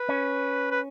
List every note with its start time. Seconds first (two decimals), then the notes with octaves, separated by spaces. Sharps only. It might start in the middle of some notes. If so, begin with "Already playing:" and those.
Already playing: B4
0.09 C#4
0.71 B4